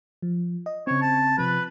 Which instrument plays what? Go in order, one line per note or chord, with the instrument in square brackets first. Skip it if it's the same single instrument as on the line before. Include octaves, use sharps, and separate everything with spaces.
[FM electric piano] F3
D#5
[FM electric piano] C#3 C4 [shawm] C#5
[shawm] A5
[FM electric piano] C3 F3 [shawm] B4